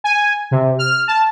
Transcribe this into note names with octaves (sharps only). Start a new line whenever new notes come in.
G#5
C3
F6
A5